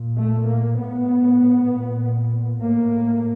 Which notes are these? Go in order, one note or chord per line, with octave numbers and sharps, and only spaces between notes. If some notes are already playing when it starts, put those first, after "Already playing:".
Already playing: A#2
A3
A#3
A2 B3
A#2
A2 A#3